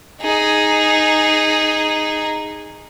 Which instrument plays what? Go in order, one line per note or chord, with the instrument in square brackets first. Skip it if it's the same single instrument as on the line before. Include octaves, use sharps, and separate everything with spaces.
[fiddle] D#4 G#4